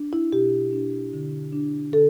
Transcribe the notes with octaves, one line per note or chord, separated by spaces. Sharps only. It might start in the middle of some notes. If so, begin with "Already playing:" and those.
Already playing: D4
E4
B2 G4
D4
D3
D4
D3 A4